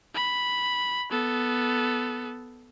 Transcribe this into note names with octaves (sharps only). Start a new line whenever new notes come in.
B5
B3 A4